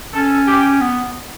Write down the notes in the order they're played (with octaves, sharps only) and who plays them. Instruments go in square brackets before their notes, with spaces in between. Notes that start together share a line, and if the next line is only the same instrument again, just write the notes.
[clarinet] C#4 [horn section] A4
[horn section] G4
[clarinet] B3